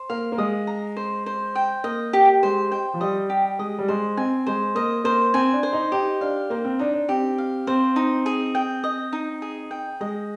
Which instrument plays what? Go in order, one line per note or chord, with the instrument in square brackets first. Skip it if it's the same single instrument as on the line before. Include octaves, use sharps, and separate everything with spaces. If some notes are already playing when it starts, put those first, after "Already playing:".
Already playing: [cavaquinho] C5
[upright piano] A#3 [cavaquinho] F5
[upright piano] A#3
[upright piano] G#3 [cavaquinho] D#6
[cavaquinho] A#5
C5
C5
G5
[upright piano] A#3 [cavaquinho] D#5
[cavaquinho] G4
[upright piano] G#3 [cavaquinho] C5
[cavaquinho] G5
[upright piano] F3
[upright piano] G3 [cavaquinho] D#5
[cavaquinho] G4
[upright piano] G#3 [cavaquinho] D#5
[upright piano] G3
[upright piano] G#3 [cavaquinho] C5
[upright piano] C4 [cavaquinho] G#5
[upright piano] G#3 [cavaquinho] C5
[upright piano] A#3 [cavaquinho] D#5
[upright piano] A#3 [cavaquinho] C5
[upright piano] C4 [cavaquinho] G#5
[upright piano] D4
[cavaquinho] C5
[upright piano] D#4
[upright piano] D#4 [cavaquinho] G4
[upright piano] D4 [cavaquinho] F5
[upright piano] A#3 [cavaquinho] C5
[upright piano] C4
[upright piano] D4 [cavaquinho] D#4
[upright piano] D4
[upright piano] C4 [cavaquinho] G4
[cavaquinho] F5
[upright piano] C4 [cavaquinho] C5
[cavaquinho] D#4
G#4
G5
D#5
D#4
G#4
G5
[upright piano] G#3 [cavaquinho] D#5